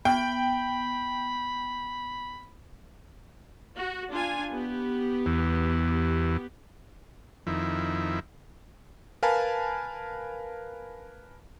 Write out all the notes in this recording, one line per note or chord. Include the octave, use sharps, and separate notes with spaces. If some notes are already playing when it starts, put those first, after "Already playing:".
B3 G5 B5
F#4
D4 F4 G#5
B3 G4
E2
F2 D#3 E4
A#4 B4 F5 G#5 A5 B5